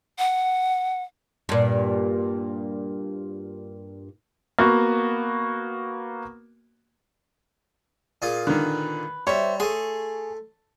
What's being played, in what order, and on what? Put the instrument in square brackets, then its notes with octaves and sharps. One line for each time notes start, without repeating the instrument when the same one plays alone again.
[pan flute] F#5
[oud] G2 A#2
[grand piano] A#3 B3 F#4
[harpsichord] A#2 F4 G#4
[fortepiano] D3 D#3 [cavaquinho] B4
[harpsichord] G3 [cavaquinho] C5 E5 [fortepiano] C#5
[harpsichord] A3 C6 [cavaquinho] G#4